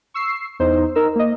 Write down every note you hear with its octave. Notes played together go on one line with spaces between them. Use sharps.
C#6 E6 C7
E2 D#4 C5
D#4 A#4 E6
A#3 D#5